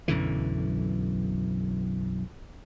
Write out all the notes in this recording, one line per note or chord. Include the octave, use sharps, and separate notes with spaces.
B1 F#2 D3 E3